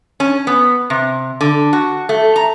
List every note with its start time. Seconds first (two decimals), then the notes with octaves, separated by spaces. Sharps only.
0.20 C#4
0.47 B3
0.90 C3
1.41 D3
1.73 F#4
2.09 A3
2.36 A#5